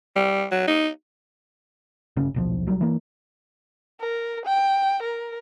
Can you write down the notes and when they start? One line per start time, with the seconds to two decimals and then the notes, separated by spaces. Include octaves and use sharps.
0.16 G3
0.51 F#3
0.68 D#4
2.16 G1 C#3 C#4
2.34 D#1 B1 F3
2.66 B1 F#3 G3
2.81 E3 A#3
4.00 A#4
4.45 G5
5.02 A#4